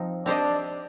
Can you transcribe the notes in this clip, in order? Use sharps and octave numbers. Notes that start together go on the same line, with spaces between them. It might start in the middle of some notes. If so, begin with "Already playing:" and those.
Already playing: F3 C4 D#4
C4 D4 G4 C5 D#5